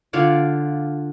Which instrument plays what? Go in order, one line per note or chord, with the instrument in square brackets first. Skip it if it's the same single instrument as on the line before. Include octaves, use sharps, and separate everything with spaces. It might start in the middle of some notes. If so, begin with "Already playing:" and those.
[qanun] D3 F4 C#5 D5